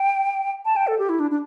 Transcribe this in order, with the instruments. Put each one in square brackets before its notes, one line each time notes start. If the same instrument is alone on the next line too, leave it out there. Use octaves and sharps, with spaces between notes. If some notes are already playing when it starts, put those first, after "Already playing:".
Already playing: [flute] G5
A5
G5
A4
G4
E4
D4
D4